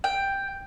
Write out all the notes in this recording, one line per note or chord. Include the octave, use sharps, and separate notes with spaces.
G5